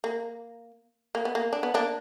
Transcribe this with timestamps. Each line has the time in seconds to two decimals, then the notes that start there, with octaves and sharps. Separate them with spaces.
0.04 A#3
1.15 A#3
1.25 B3
1.35 A#3
1.53 D4
1.63 B3
1.74 A#3 D4